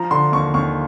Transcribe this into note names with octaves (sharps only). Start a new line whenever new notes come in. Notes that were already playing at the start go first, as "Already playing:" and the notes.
Already playing: F3 A#5
D3 C6
D#2 C#6
D#2 C#6